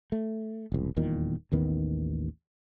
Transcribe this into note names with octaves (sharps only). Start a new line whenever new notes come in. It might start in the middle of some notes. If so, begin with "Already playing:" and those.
A3
E1 C2
D#1 E2 A#2 D#3
A1 D#2 D#3 B3